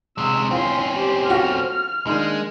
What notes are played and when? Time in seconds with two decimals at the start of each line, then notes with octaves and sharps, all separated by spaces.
0.18 C3 G#3 E6
0.51 C4 C#4 E4 F4 C6
0.93 G4 C5
1.29 F4 F#4 A4 F6
2.07 D#3 G#3 A#3 D4